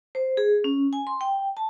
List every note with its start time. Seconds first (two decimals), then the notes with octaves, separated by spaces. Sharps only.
0.15 C5
0.37 G#4
0.64 C#4
0.93 G#5
1.07 C6
1.21 G5
1.57 A5